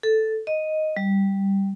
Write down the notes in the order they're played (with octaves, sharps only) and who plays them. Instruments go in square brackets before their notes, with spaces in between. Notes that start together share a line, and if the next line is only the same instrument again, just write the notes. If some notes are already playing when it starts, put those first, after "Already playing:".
[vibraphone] A4
D#5
G3